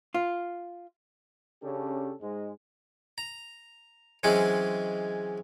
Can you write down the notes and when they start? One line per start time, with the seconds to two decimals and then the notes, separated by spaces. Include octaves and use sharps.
0.14 F4
1.62 C#3 C#4 D4 G4 A4
2.20 G#2 G#3
3.18 A#5
4.23 E3 F#3 G#3 C4 C#4